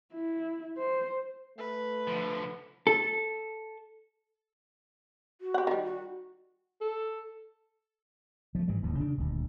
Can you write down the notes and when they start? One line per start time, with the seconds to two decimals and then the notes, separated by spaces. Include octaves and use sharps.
0.13 E4
0.78 C5
1.58 A3 B4
2.07 D3 F3
2.87 A4
5.41 F#4
5.54 G4 F#5
5.67 D#3 G3
5.84 F#4
6.81 A4
8.55 F3 A3
8.68 G#2 E3 G3
8.82 D1 D#2 A2
9.00 C#3 D4
9.17 D#1 D2